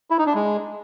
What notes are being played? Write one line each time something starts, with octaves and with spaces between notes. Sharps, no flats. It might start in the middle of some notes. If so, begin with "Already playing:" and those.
E4
D#4
D4
G#3